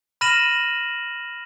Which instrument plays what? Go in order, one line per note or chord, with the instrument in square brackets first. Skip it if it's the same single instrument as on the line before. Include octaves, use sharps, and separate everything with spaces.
[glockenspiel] B5 F6 A#6 D#7 E7 F#7